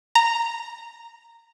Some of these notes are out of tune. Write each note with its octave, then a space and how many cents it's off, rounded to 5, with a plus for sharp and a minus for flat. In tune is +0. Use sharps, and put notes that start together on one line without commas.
A#5 -10